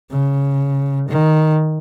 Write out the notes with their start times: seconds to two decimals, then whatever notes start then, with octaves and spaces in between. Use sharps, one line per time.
0.11 C#3
1.09 D#3